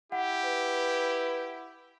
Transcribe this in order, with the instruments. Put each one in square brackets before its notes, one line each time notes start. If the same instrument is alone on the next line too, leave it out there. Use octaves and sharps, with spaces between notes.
[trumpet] E4 [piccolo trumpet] G4 [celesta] F#5
[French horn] B4